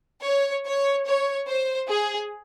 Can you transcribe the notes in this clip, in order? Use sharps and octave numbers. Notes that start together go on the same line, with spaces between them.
C#5
C#5
C#5
C5
G#4